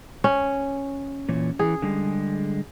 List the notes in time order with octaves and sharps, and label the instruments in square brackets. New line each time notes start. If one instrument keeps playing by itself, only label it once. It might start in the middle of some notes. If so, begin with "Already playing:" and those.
[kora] C#4
[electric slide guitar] A#2 E3 C#5
[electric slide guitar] E3 [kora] G#4
[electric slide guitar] D3 G3 G#3